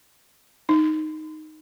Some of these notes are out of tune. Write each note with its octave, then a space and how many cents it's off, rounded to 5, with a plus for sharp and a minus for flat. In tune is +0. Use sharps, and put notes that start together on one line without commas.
D#4 +0